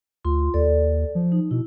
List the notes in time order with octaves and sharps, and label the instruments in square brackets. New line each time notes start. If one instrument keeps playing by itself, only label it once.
[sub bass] D2 [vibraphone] F4 C6
[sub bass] D#2 [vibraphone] A4 D5
[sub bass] F3
[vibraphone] D#4
[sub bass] B2 [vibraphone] E4